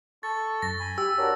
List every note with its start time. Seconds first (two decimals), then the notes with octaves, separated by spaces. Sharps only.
0.23 A4 C#6 A6
0.62 F#2 A#6
0.80 G#5 B5
0.98 G4 E6
1.18 D4 F#4 A#4 C#5